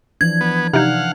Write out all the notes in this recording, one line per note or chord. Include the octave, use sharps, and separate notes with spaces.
E3 F3 D4 G#6
B3
C3 D4 D#4 F5 F#5